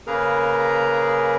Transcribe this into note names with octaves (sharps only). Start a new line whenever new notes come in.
C#3 A#3 G#4 A#4 B4 A#5